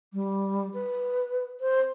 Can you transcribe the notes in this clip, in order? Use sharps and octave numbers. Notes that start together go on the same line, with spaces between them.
G3
B4
C5